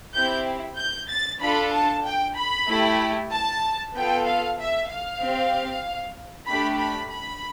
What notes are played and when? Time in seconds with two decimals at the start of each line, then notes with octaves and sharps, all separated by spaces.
0.14 C4 E4 G4 G6
0.77 G6
1.09 A6
1.41 D4 F4 A4 B5
1.74 A5
2.05 G5
2.36 B5
2.69 A3 E4 G4
3.31 A5
3.95 B3 F4 A4 G5
4.26 F5
4.59 E5
4.90 F5
5.22 C4 G4
6.48 A3 D4 G4 B5
6.80 B5
7.12 B5